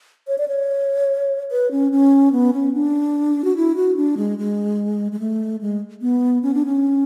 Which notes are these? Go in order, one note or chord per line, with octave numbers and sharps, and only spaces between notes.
C#5
D5
C#5
B4
C#4
C#4
B3
C#4
D4
F#4
E4
F#4
D4
G#3
G#3
G#3
A3
G#3
B3
C#4
D4
C#4